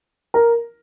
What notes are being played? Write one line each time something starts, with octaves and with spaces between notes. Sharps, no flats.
A#4